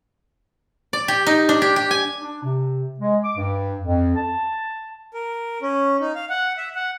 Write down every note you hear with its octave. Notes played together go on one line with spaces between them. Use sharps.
D5
G4
D#4
D4
G4
G4
G#5
D4
C3
G#3
D6
G2
F2
A5
A#4
C#4
D#4
F5
F#5
E5
F#5